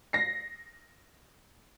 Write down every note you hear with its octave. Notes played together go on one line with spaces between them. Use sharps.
A#6 C7